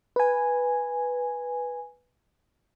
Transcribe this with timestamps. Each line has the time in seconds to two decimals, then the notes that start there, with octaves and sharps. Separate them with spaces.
0.16 B4 G#5